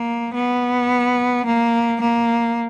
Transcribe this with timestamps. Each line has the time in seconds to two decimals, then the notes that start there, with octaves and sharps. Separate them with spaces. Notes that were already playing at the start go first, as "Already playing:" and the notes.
Already playing: A#3
0.34 B3
1.46 A#3
2.01 A#3